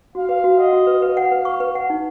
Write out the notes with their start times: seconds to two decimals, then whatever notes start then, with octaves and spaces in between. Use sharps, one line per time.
0.15 F#4 F5
0.29 B4
0.44 F#4
0.58 D#5 F#5
0.73 F#4
0.87 B4
1.02 B4 F5
1.17 F#5
1.32 B4
1.45 C#6
1.60 B4
1.75 F#5
1.90 D#4